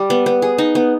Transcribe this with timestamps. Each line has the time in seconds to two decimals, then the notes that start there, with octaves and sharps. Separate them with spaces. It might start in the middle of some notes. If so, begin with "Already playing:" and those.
Already playing: G3
0.10 B3
0.26 B3
0.42 G#4
0.58 D#4
0.75 B3